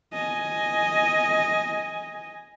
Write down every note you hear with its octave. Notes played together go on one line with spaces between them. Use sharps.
D#5 G#5